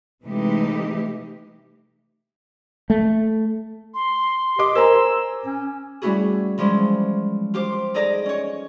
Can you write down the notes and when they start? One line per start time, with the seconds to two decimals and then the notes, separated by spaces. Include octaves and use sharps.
0.24 C3 E3 G#3 A3 D#4 G4
2.90 A3
3.94 C6
4.59 G4 D#5 D6
4.75 A#4 C5 G#5 A#5 E6
5.46 C#4
6.02 G3 A3 C#4 E4 F#4 G#4
6.58 E3 F3 G3 G#3 C#4
7.54 F4 G4 C5 D6
7.94 D#4 G#4 A4 D5 D#5 A#5
8.26 C#4 C#5